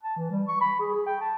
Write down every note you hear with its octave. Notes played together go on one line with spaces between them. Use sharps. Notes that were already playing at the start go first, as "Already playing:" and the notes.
A5
E3
G3
C#6
B5
G#4
G#4
G5
A5